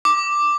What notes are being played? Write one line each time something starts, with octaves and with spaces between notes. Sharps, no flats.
D6